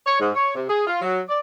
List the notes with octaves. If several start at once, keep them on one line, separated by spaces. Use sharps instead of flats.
C#5
G#2
C#5
C3
G#4
F4
F#3
D5